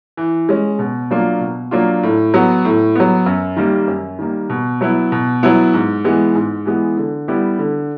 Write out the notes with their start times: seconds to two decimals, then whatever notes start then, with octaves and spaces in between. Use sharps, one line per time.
0.17 E3
0.49 G#3 C#4
0.79 B2
1.11 F#3 A#3 D4 F4
1.41 B2
1.71 F#3 A#3 D4 F4
2.03 A2
2.34 F#3 B3
2.65 A2
2.95 F#3 B3
3.26 F#2
3.57 D#3 G3 A#3
3.88 F#2
4.19 D#3 G3 A#3
4.50 B2
4.81 F#3 B3 E4
5.12 B2
5.43 F#3 B3 E4
5.74 G#2
6.04 E3 G#3 B3
6.35 G#2
6.66 E3 G#3 B3
6.97 D3
7.28 G3 B3 E4 G4
7.59 D3